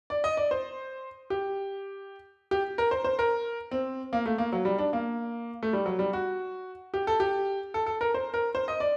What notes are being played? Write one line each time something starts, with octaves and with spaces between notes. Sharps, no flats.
D5
D#5
D5
C5
G4
G4
A#4
C5
C5
A#4
C4
A#3
A3
A#3
F#3
G3
D4
A#3
A3
G3
F#3
G3
F#4
G4
A4
G4
A4
A4
A#4
C5
A#4
C5
D#5
D5